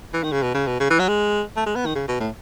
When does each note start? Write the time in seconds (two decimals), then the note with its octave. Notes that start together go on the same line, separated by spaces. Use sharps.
0.14 E3
0.23 D#3
0.32 C#3
0.42 B2
0.55 C#3
0.67 B2
0.80 C#3
0.90 E3
0.99 F#3
1.08 G#3
1.56 A3
1.67 G#3
1.76 B3
1.86 D#3
1.95 C#3
2.08 B2
2.20 A2